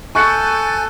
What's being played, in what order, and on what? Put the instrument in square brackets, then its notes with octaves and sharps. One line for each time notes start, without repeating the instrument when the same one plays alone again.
[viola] A4 [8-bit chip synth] G#5 G6 A6 [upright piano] C#6 F#6 C#7